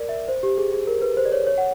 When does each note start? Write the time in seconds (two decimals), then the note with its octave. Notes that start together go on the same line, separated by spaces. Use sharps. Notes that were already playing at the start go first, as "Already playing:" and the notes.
Already playing: A#4 D5
0.09 E5
0.28 C5
0.43 G4
0.58 G#4
0.73 G#4
0.87 A#4
1.02 B4
1.17 C5
1.25 D5
1.32 C#5
1.47 C#5
1.58 F#5